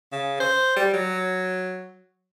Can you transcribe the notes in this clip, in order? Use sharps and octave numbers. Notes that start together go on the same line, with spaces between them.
C#3
C5
G3
F#3